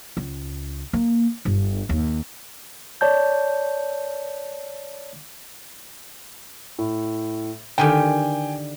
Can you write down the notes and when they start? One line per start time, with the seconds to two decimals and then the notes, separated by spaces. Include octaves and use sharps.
0.17 C#2
0.93 A#3
1.45 G1
1.89 D#2
3.01 C#5 D5 A5 G6
6.79 A2
7.78 D3 D#3 G4 G5 G#5